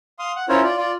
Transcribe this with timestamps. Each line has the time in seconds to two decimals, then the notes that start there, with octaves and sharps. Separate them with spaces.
0.19 F5 C6 D#6
0.36 F#5
0.49 C#4 E4 F4 A#4 C5 C#5
0.64 F4 D5
0.77 F4 D5